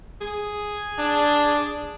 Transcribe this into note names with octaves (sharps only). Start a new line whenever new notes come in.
G#4
D4